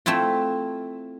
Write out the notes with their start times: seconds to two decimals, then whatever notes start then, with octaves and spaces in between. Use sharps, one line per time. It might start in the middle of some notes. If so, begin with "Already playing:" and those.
0.06 A3 C4 E4 F4